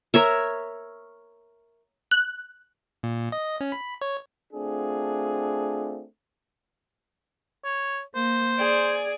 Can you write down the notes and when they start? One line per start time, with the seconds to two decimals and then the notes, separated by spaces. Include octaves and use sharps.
0.14 A#4 C#5 E5
2.11 F#6
3.03 A#2
3.32 D#5
3.60 C#4
3.72 B5
4.02 C#5
4.52 A3 C4 D4 F4 G#4
7.64 C#5
8.15 A#3 C5
8.57 G#4 D5